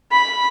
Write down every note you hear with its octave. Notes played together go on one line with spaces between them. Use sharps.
B5